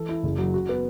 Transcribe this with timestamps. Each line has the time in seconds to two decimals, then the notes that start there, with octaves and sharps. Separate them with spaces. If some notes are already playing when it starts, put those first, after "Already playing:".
Already playing: E3 A4
0.09 E4
0.23 F#1
0.38 F#3
0.54 F#4
0.69 B3